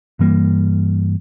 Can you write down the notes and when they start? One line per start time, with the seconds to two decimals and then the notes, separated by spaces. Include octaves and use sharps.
0.19 G2 E3 G3 A#3